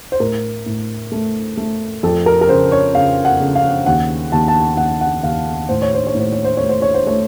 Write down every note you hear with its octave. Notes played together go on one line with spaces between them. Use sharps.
C5
A2 A#4
A2
A3
A3
F2 A4
A#4
A#4
C#3 C5
C#5
C#3 F5
F#5
C#3
F5
D#2 F#5
D#2 A5
A5
D#2 F#5
F#5
D#2 F5
A2 C5
C#5
C5
C#5
A2 C5
C#5
C5
A3 C#5
C5
C#5
C5
A3 C#5